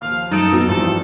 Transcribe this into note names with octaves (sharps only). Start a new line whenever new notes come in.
D#2 F3 F5 F6
F#2 D#4 A4 D#6 D7
B3 F#4 E6
G2 E3 F3 C4 A4